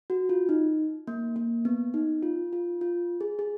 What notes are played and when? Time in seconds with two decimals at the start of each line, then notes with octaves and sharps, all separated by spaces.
0.10 F#4
0.29 F4
0.49 D#4
1.07 A#3
1.36 A#3
1.65 B3
1.94 D#4
2.23 F4
2.53 F4
2.81 F4
3.21 G#4
3.39 G#4